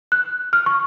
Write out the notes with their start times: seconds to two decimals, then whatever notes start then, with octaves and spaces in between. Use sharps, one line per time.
0.12 F#6
0.53 F6
0.66 C#6